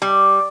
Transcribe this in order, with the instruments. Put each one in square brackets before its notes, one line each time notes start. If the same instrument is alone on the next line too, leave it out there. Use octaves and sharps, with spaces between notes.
[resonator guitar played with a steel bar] G3